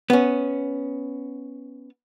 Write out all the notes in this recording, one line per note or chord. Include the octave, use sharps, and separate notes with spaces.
B3 C#4